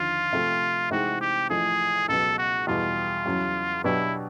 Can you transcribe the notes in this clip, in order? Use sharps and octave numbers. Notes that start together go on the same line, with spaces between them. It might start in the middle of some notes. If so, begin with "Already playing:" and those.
Already playing: D#2 D3 F3 F4
C3 F3 A3
C3 E3 G#3 C4 D#4 F#4
G4
A1 A2 F3 A3 G#4
C#2 B2 F#3 B3 A4
F#4
E2 B2 G3 F4
E2 C#3 F#3
B2 F#3 B3 D4 E4 G4